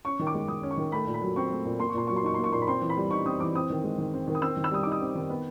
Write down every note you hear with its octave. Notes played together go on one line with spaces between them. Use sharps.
C#4 C#6
D#3
D6
G#3
D#3 D#6
C#4
C#6
D#3
A3 B5
A#2
B5
F#3
C4 C#6
A3
A#2
A#3 C6
C#6
A#2 C6
F#3 C#6
C6
D#4 C#6
A#3 C6
C#6
A#2 C6
B5
C4 C6
E3
B5
G3
D#4 C#6
C4 D#6
E3 D6
C4 D#6
D#3
G#3
D#3
C4
D#3
D#6
C4 E6
D#3
E6
G3 D#6
D#4 D6
D#6
C4
D#3
B3